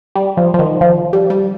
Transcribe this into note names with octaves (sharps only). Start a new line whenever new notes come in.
G3
F3
F3
D#3
F3
G3
G3